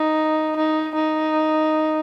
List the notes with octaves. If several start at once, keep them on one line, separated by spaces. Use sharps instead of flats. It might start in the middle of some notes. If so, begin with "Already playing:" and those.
Already playing: D#4
D#4
D#4